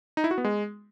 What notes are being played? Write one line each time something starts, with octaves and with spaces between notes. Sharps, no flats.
D#4
E4
F#4
B3
G#3